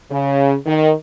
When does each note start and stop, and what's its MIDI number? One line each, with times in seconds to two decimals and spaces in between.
0.10 0.53 49
0.65 0.91 51